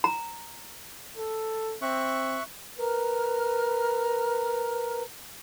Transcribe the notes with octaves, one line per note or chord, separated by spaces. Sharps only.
A#5
A4
C4 E5 C#6 F#6
A#4 B4 A#5 F6